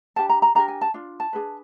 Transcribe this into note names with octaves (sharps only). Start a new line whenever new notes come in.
D4 G4 A#4 A5
A#5
A#5
D4 G4 A#4 A#5
G#5
A5
D4 F4
A5
D4 F4 G#4 B4